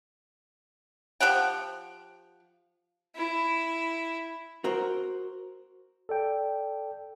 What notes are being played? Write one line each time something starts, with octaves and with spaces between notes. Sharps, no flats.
F3 G4 F#5 G5
E4
F#4 A#4 C5
A4 D5 G5